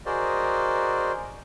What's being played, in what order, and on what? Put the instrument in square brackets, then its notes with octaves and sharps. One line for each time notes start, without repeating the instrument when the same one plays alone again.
[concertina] F#4 G#4 A#4 C5 D5 D#5